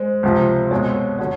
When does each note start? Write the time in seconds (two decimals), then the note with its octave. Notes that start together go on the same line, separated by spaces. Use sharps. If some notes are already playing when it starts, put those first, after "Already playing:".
Already playing: G#3 C5
0.23 C#2 C3 F3
0.71 B2 G#3 C4 C#5
1.19 D3 F#3 C#5